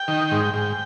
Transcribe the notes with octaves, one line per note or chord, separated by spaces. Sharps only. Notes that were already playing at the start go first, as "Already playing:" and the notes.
Already playing: G5
D#3
G#2
G#2